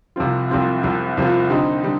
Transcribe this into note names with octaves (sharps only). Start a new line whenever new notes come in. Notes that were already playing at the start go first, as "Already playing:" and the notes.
C2 C3 F3 C4 F4
C2 C3 F3 C4 F4
C2 C3 F3 C4 F4
C2 C3 F3 C4 F4
D3 G3 C4 D#4
D3 G3